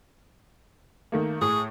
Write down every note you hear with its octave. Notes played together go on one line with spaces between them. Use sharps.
D#3 A3 A#3
A2 G#4